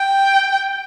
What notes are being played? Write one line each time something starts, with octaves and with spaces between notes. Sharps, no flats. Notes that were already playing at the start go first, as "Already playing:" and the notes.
Already playing: G5